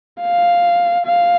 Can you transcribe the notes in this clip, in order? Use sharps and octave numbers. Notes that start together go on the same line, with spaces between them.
F5
F5